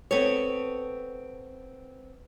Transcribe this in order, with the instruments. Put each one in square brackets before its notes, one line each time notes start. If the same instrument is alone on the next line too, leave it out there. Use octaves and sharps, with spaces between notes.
[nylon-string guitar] B3 C4 A4 C#5